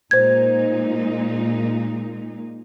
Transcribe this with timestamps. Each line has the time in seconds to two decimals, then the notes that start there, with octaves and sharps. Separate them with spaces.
0.11 A#2 G#3 D#4 C5 G#6